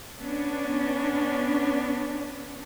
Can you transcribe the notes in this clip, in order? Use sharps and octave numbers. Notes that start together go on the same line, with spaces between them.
B3 C#4 D4